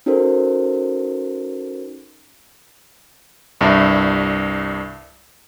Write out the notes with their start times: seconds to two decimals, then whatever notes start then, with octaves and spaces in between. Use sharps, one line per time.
0.06 C#4 D#4 F#4 A4 A#4 C5
3.61 C2 G2 E5